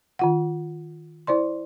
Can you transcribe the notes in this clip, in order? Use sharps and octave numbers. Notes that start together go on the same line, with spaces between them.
D#3 F4 F#5
E4 C5 D5 C6